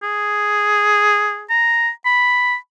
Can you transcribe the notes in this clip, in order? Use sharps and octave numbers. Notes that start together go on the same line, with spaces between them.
G#4
A#5
B5